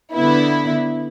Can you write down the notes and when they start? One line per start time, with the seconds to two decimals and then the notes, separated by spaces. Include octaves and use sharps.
0.14 D3 B3 E4